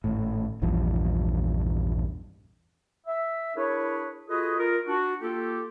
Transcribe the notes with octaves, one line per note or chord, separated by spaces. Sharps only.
G#1 A2
A#1 E2 G2 F3
E5
D4 E4 G#4 A#4 B4 C#5
F4 F#4 G#4 A4 B4 D#5
F4 A#4
D4 F#4
A#3 F4 G4 A4